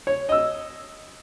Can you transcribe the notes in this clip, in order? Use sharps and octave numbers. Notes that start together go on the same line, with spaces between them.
C#5
D#5 E6